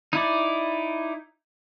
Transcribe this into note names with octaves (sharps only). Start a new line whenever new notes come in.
D#4 E4 D5